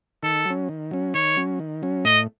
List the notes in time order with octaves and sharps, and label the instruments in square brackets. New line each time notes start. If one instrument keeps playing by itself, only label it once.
[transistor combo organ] D#3 [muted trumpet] A4
[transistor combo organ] F#3 C#4
D#3
F#3 C#4
[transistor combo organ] D#3 [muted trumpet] C#5
[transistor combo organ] F#3 C#4
D#3
F#3 C#4
[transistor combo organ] A2 [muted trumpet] D#5